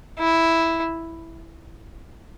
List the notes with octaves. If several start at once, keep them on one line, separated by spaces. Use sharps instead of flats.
E4